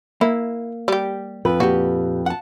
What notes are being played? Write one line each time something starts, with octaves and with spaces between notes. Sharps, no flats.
A#3 E4
G3 G4
F2 B4
A#2 F#4 G4
F#5 A5